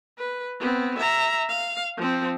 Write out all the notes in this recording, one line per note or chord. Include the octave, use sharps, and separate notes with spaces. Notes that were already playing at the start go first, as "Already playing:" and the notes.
B4
B3 C4
E5 A#5
F5
F3 C4